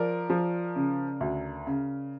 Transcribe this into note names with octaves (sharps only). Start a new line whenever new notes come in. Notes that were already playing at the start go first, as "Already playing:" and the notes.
Already playing: F3 A#4 D5
F3
C#3
D2
C#3